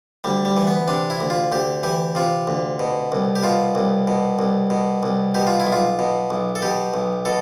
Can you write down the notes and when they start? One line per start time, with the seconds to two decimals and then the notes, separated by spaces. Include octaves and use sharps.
0.24 D2 G3
0.45 G3
0.57 E3
0.67 B3
0.88 C3 D4
1.10 E4
1.21 D2
1.30 F4
1.52 D2 G4
1.83 E3 G4
2.15 C3 F4
2.47 D2
2.79 B2
3.12 C2
3.36 G4
3.43 B2 F4
3.75 C2
4.07 B2
4.39 C2
4.70 B2
5.03 C2
5.34 B2 G4
5.47 F4
5.60 E4
5.67 B1
5.72 F4
5.99 B2
6.30 B1
6.55 A4
6.62 B2 G4
6.94 B1
7.25 B2 A4